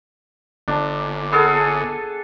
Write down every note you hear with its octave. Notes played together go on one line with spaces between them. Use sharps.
G1 D4
B3 G#4 A4